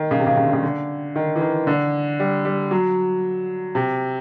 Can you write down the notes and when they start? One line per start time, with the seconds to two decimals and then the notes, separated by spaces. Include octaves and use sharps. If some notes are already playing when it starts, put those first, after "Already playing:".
Already playing: D#3
0.11 C#3
0.20 C3
0.27 C#3
0.37 C#3
0.45 D3
0.53 C#3
0.63 D3
1.16 D#3
1.36 E3
1.41 D#3
1.67 D3
2.20 G3
2.45 G3
2.71 F#3
3.75 C3